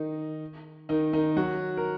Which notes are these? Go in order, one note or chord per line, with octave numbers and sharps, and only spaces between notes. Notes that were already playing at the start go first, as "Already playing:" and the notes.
Already playing: D#3 D#4
D#3 D#4
D#3 D#4
F#3 F#4
A#4